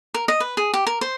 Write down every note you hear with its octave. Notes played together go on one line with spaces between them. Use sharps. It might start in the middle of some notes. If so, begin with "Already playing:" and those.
A#4
D#5
B4
G#4
G4
A#4
C5